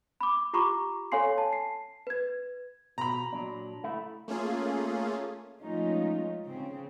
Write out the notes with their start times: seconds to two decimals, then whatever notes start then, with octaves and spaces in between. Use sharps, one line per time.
0.21 B5 D6
0.53 F4 G4 A#5 B5 C#6 D6
1.12 A4 C#5 F5 G#5 C6 C7
1.38 A5
1.53 C7
2.07 B4 G#6
2.98 B2 A#5 B5
3.33 A#2 F#3 D4
3.83 C#3 A3 E4
4.28 A3 A#3 C#4 F4 G#4
5.61 F3 G#3 A3 C#4 D#4 F4
6.46 C#3 C4